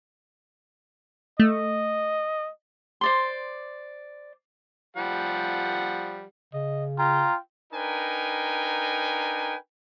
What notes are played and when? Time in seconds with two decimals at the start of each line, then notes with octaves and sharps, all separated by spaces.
1.40 A3 D#5
3.01 C5 D5 C6
4.97 F3 G3 F#5
6.54 C#3 D#5
6.98 F4 G5 A#5
7.73 D4 D#4 A#4 B4 G5 G#5